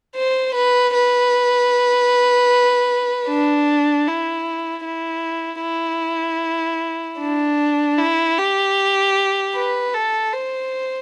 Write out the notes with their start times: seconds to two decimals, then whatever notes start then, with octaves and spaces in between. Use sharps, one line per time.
0.16 C5
0.55 B4
0.94 B4
3.28 D4
4.07 E4
4.85 E4
5.63 E4
7.19 D4
7.98 E4
8.38 G4
9.55 B4
9.94 A4
10.33 C5